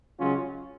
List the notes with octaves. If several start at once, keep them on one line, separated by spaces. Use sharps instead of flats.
C#2 C#3 F#3 C#4 F4